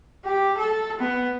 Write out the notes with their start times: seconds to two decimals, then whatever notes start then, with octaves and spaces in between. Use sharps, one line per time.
0.24 G4
0.58 A4
0.99 B3